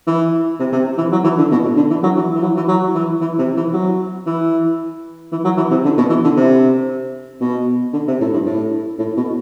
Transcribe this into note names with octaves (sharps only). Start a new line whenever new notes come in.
E3
C3
C3
E3
F#3
E3
D3
B2
A2
D3
E3
F#3
E3
E3
F#3
E3
F#3
E3
E3
C3
E3
F#3
E3
E3
F#3
E3
C3
D3
B2
E3
D3
C3
B2
D3
C3
A2
G2
A2
A2
B2